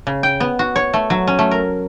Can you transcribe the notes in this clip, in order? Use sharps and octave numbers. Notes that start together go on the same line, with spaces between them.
C#3
G5
B3
F#4
C#5
A3
F#3
C#4
A3
A#4